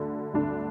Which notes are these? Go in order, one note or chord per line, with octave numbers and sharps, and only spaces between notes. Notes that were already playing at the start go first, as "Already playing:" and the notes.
Already playing: D2 D3
D2 D3 D4